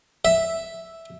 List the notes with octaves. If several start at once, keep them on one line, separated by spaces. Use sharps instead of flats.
E5